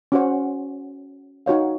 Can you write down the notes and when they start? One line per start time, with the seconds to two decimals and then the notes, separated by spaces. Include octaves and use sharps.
0.12 C#4 F#4 C5 F#5
1.46 D#4 F#4 C#5 F5